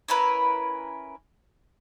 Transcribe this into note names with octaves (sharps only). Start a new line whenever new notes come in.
C#4 E4 A#4 B4